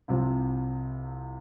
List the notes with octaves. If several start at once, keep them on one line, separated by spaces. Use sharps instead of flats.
C2 C3 F3 C4